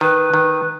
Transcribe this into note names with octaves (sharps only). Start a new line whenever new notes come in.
D#3 B4
D#3